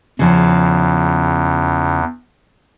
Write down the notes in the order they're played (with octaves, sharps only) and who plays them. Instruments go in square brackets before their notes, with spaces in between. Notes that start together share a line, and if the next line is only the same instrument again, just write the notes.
[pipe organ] E2 [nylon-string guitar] C#3 F3